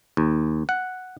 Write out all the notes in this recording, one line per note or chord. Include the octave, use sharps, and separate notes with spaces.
D#2
F#5